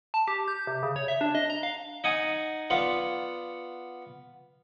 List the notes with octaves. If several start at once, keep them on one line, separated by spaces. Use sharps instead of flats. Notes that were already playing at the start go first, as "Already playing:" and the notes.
A5
G4
G6
C3
C#3
C#5
E5
D4
D#5
A#5
F5
D#4 F#5 G#5 D#6
B3 F4 D5 F#5